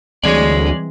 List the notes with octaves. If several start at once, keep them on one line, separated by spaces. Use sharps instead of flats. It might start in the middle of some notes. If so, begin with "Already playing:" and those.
D2 E3 G3 G#3 C4 G#4 C#5 D5